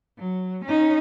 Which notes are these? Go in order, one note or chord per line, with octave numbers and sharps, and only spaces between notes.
F#3
C#4 D#4